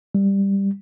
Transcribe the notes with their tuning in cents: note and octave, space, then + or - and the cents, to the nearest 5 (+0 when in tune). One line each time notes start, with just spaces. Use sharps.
G3 +10